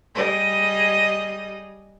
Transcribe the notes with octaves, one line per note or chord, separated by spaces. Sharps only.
G3 G#4 D#5